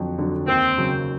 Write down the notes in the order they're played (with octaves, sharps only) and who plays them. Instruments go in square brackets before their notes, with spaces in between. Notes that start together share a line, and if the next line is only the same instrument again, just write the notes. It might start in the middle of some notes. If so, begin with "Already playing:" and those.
Already playing: [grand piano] F2 D3 F#3
D3 F#3
[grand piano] D#2 [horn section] C4
[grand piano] C#3 F#3